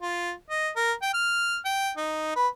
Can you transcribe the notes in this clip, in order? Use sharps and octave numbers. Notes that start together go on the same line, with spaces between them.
F4
D#5
A#4
G5
F6
G5
D#4
B4